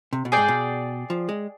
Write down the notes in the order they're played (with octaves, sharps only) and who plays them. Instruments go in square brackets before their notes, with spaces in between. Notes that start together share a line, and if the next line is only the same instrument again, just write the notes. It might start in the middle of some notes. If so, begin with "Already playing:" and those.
[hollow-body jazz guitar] C3
B2
[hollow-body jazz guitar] G#2 [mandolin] G#4 D5 G5
[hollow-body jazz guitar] B2
F3
G#3